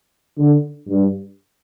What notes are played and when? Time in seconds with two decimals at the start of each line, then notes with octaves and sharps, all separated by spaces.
0.38 D3
0.88 G2